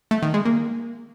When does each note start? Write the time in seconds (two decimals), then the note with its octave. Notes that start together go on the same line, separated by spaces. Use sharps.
0.11 A3
0.22 D#3
0.34 G#3
0.45 A#3